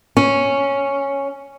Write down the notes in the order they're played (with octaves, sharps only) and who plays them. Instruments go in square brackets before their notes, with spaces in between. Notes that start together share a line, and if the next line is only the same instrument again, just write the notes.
[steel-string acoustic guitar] C#4